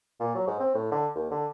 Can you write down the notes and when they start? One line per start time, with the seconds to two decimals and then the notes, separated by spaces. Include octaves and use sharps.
0.20 A#2
0.35 F#3
0.47 G#2
0.60 C4
0.74 A2
0.92 D3
1.15 D#2
1.31 D3